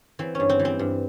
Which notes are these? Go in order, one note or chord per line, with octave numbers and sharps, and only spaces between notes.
E3 C4
G2 C#4
C4
E3
C4
G2